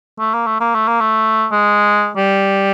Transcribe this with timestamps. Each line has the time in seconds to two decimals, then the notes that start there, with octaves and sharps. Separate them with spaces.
0.19 A3
0.34 A#3
0.47 A3
0.60 A#3
0.75 A3
0.88 A#3
1.01 A3
1.52 G#3
2.17 G3